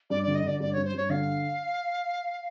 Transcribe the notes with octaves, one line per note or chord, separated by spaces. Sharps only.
G2 D5
D3 D5
D#5
D3 D5
G2 D5
G2 C#5
C5
G2 C#5
D3 F5